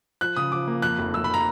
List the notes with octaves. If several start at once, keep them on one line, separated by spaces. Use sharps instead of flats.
F3 F#6
C#3 D#6
F3 D6
A#3
F2 F#6
F1
F1 E6
B5
A#5